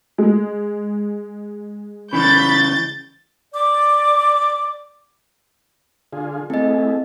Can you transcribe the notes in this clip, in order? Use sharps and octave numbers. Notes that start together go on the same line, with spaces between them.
G#3
C#3 E3 B5 G6 A6
D5 D6
D3 F4 G#4
A3 C4 E4 G#4 D#5